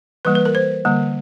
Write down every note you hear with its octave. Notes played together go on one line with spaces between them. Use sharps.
E3 G3 A#3 B4
B4
A#4
C5
D3 G3 A#3